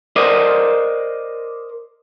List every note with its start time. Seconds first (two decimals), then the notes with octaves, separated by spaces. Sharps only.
0.16 A#4 C5 D5 D#5